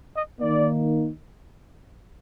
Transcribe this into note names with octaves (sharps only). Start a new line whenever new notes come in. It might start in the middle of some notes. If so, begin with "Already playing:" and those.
D#5
D#3 A#3 D#4 D5